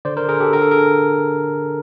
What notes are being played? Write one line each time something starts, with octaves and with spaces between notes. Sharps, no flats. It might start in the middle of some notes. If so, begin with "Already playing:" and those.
D3 C5 D5
A#4 C5
D3 G#4 A#4
G4 A4
D3 A#4
A4
D3 G#4 A#4